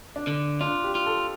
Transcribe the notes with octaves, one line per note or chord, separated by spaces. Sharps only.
D4
D3
D4 F4
G4
F4
A4